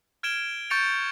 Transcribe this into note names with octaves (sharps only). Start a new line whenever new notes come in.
F6 G#6 D7 E7 G7
C#6 G6 A6 C#7 D7 F7